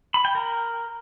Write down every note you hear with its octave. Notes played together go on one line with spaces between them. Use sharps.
B5
G5
A#4